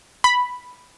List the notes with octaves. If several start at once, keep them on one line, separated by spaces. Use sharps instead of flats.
B5